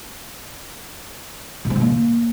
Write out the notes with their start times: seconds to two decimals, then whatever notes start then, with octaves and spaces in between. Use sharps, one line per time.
1.65 B2
1.70 C4
1.76 B2
1.81 A#3